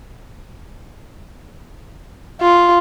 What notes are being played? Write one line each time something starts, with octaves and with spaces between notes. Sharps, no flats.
F4